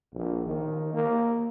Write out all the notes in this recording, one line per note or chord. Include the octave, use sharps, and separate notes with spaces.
A#1
D#3
A#3